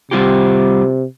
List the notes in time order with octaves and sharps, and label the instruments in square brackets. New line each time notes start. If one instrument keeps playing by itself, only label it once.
[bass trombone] C3 [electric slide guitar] G3 F4 G4